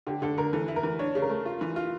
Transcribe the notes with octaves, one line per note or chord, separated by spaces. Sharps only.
D3 G4
D3 A4
D3 A#4
E3 A4
E4
A#4
E3
D4 C#5
C#3
A#4
A3
F4
E3
F4